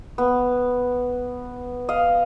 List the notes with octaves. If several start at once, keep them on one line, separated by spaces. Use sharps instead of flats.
B3
D#5 F5